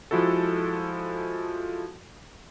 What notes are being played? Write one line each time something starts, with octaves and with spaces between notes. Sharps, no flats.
F3 G#3 E4 F#4 A4